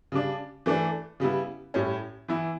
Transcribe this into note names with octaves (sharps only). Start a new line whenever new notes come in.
C#3 G3 D4
E3 A3 D4
C#3 G3 B3 E4
A2 G3 C#4
E3 B3 E4